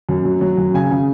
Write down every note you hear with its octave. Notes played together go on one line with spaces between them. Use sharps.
F#2
F#3
F#3
F#2
C#3 G#5
C#3